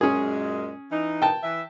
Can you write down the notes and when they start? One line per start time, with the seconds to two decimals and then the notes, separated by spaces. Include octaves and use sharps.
0.01 F#2 A#2 G#3 C#4 G#4
0.91 E3 D#4
1.22 G5 A5
1.43 E3 E5